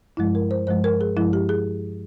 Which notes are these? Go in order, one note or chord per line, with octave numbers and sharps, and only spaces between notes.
G2 F3 G#3 E4
A#4
C5
G2 F3 G#3 C5
A#4
G#4
G2 F3 G#3 E4
G4
G#4